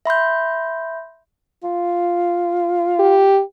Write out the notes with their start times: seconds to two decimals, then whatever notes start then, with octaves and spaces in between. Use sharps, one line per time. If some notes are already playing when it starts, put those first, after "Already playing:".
0.06 E5 B5 C6 G6
1.63 F4
2.99 G4